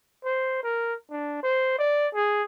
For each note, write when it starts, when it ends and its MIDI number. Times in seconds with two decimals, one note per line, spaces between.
0.24 0.60 72
0.64 0.95 70
1.11 1.39 62
1.43 1.78 72
1.79 2.08 74
2.15 2.43 68